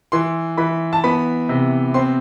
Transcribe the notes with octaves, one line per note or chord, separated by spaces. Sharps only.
E3 C6
E3 B5
A5
B3 B5
C3
C4 C6